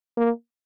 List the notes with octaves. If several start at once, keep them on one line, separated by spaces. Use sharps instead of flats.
A#3